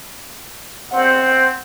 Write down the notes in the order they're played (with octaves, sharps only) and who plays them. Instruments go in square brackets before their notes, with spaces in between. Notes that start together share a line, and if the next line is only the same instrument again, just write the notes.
[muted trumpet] C4 [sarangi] F#5